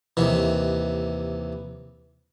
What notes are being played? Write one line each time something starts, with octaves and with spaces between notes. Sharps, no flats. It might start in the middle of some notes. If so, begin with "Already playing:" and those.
D#2 C3 E3